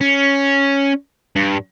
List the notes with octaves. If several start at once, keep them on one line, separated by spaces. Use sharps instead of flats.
C#4
G2